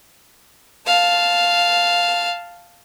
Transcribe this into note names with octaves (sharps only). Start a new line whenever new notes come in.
F5 A5